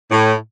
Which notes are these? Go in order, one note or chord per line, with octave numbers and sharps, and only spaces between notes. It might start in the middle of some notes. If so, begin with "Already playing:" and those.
A2